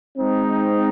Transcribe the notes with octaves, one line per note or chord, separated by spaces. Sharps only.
G#3 C4 D#4